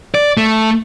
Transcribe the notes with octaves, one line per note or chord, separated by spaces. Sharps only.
D5
A3